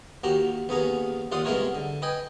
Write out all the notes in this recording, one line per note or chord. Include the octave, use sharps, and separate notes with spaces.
D#2 F#4 G4 A#5
D#2 B3 C#4 G#4 A#5
D#2 F4 D5 F#5 C6 D#6
C2 G#3 B3 E4 A#4 C#5
D3
B4 D#5 G5 G#5